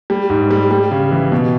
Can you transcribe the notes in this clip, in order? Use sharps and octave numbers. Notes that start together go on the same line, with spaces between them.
G3
G#2
G3
G3
C#3
E3
B2